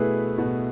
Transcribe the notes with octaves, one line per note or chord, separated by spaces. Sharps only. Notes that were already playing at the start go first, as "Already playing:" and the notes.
Already playing: B2 A3 E4 G#4 B4
B2